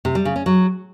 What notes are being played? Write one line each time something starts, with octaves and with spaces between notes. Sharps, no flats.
C3
G3
C#3
C#4
F#3